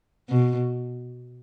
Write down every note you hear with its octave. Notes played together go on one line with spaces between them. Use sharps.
B2